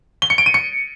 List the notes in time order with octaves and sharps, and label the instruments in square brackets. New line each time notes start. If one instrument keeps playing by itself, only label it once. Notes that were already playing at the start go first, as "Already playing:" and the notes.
[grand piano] G7
C#7
D7
D#7
C#7